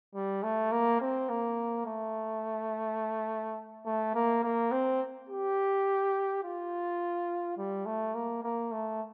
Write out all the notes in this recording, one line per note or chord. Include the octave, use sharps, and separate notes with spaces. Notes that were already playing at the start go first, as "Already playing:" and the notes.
G3
A3
A#3
C4
A#3
A3
A3
A#3
A#3
C4
G4
F4
G3
A3
A#3
A#3
A3